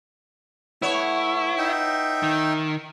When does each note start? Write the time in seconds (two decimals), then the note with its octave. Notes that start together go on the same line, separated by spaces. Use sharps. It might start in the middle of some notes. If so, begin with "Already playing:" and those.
0.82 A3 B3 E4 C#5
1.58 D#4 E5 G5
2.23 D#3